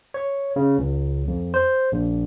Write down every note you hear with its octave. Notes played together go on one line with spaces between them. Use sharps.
C#5
C#3
C#2
F2
C5
A#1